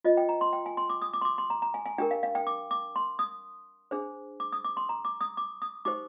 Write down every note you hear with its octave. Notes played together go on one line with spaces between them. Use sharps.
F4 C5 D#5
G5
A#5
C6
G5
G#5
C6
D6
D#6
D6
C6
D6
C6
A#5
A#5
G#5
G#5
D4 G4 A#4 G5
F5
F5
G5
D6
D6
C6
D#6
D4 G#4 C5
D6
D#6
D6
C6
A#5
D6
D#6
D6
D#6
D#4 G4 C5 D6